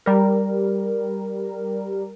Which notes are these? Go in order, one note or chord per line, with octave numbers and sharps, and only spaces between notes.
G3 A#4